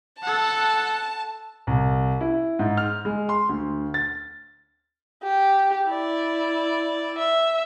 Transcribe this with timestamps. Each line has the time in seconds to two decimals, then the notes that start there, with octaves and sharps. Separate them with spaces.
0.23 A4 F#5 A5
1.67 C2
2.21 E4
2.59 G#2
2.77 F6
3.05 G#3
3.29 C6
3.49 D2
3.94 A6
5.23 G4
5.88 E4 D5
7.18 E5